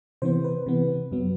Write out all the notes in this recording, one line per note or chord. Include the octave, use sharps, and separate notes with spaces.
C3 E3 B3 C5
B4
C3 E3 B3
F#2 F#3 B3